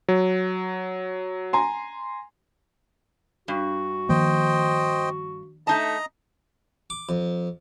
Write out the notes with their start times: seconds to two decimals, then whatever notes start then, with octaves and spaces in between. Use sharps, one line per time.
0.08 F#3
1.53 G#5 A#5 C6
3.48 G2 F#4
4.09 D#3 F3 A#3 C5 D#5 G5
5.67 A3 D#4 D#5 A5 A#5
6.90 D6
7.09 F2